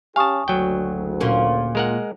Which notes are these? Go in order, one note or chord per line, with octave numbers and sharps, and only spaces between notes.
C#4 G4 F5 G#5 A5 C#6 D#6
F#1 D2 F#3 G5
A#2 A#3 C#4
G#3 A#4 F#5